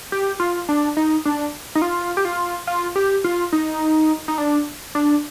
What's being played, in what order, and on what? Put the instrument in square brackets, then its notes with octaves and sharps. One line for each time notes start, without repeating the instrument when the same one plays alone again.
[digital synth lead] G4
F4
D4
D#4
D4
D#4
F4
G4
F4
F4
G4
F4
D#4
D#4
D4
D4